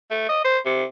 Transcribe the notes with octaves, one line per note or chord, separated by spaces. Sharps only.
A3
D#5
C5
C3